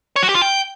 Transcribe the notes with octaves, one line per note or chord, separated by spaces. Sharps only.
C#5
F#4
G4
F4
G5